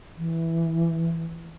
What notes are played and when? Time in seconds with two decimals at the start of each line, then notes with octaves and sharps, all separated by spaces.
0.18 E3